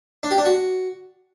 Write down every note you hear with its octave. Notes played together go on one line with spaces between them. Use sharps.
D4
G4
D4
F#4